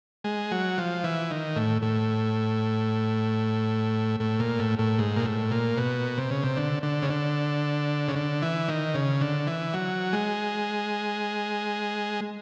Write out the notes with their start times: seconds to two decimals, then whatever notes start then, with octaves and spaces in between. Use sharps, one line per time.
0.24 G#3
0.51 F#3
0.78 F3
1.04 E3
1.31 D#3
1.56 A2
1.82 A2
4.20 A2
4.40 A#2
4.59 A2
4.79 A2
4.99 G#2
5.16 A#2
5.25 A2
5.51 A#2
5.77 B2
6.18 C3
6.31 C#3
6.44 C3
6.57 D3
6.83 D3
7.02 C#3
7.10 D3
8.08 C#3
8.16 D3
8.42 E3
8.68 D#3
8.94 C#3
9.21 D3
9.47 E3
9.73 F#3
10.13 G#3